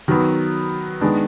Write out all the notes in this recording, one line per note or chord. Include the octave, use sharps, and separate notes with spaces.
D#3 F#3 B3
D#3 G#3 B3 D4